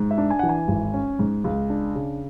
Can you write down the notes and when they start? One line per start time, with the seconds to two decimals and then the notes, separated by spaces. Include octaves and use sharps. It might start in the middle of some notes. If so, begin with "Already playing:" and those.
Already playing: G#2
0.11 E5
0.18 D4
0.30 G#5
0.39 E3 F#5
0.49 G#5
0.68 G#1
0.94 C#4
1.19 G#2
1.44 C#2
1.70 D4
1.95 C#3